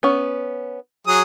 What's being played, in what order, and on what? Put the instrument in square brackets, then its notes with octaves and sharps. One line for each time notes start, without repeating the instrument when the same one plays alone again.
[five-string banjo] B3 C#4
[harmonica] F#3 G#4 D#6